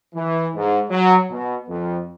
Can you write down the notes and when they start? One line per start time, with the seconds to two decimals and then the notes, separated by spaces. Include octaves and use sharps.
0.15 E3
0.55 G#2
0.90 F#3
1.31 B2
1.69 F2